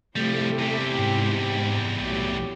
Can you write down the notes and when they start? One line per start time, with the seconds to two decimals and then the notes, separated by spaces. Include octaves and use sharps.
0.16 C3 F3 G3 A3 E4 G4
0.58 E2 G3
0.98 G#2
2.00 B1 A2 F#3 G4